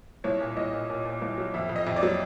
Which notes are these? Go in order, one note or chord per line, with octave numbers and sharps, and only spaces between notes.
C2 C#5
A#2
C2 D#5
A#2
A#2
A#2
C2
F#3
F2 E5
F2
D#5
F2
D5
F#3